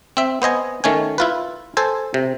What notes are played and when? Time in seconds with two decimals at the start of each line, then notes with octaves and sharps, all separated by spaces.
0.17 C4 E5
0.42 B3 C5 D#5 G#5
0.84 D#3 A3 C#4 G#5
1.18 E4 F4 B4
1.77 A4 C5 G#5
2.14 C3